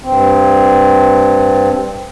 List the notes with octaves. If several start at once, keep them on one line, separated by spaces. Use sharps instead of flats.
G2 C4